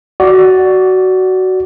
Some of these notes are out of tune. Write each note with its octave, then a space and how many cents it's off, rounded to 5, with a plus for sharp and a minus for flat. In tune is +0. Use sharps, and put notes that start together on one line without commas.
F#4 +15 D5 +0